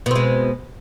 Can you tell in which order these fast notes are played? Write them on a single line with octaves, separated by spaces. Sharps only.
B2 C4 G#3